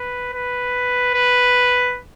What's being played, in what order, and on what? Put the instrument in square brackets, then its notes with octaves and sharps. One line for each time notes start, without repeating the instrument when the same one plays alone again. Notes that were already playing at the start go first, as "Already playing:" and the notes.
Already playing: [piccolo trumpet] B4
B4
B4